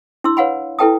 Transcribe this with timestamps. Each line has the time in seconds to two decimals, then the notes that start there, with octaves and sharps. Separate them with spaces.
0.24 D4 E4 C6 E6
0.37 B4 C#5 F5 F#5 G#5 B5
0.79 E4 A4 B4 G5 A5 D#6